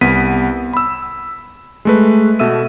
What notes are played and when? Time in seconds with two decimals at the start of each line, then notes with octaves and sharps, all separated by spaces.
0.01 C2 B3 B6 D#7
0.73 B5 E6
1.85 G#3 A3 B4
2.39 B2 A4 E5 E6 D#7